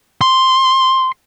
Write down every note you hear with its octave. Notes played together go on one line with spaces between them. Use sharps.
C6